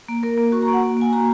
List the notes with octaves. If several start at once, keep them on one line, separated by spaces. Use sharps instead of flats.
A#3
A#3 A#4
A#3
F#4 C#6
A#5
A#3 F#5
A#3
A#3 G#5
F#4 A#5